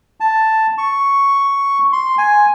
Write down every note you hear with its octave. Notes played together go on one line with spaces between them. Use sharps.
A5
C#6
C6
G#5